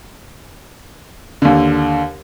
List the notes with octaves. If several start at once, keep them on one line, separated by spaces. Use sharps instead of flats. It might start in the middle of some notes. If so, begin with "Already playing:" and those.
D#2 D3